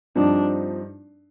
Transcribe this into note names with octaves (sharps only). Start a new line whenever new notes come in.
G2 F3 C4 D4 D#4